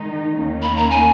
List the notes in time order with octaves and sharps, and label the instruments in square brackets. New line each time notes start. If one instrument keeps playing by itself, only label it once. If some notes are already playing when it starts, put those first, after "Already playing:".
Already playing: [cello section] D#3 G#3 D#4
D#2 D#3 A#3 C#4
[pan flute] B5
A#5
G#5